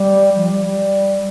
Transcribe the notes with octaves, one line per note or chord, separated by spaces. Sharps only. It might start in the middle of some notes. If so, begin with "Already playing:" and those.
Already playing: G3
F3
G3
G3